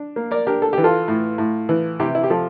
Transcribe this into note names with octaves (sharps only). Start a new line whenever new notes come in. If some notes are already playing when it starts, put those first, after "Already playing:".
Already playing: D4
A#3
A#4 D5
D4 G4 A#4
A4
E3 G4
F4 A4
A2
A2
E3
C3 E4 G4
E4
G4
F3 F4 A4